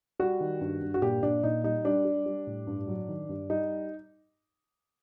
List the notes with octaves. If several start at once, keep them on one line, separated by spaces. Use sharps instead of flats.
G3 F#4
D#3
G2
G2
F#4
A#2 G4
A#2 D4
A#2 D#4
G3 D#4
G3 D4
G3
G3
A2
G2
F#3
D#3
G2
G3 D#4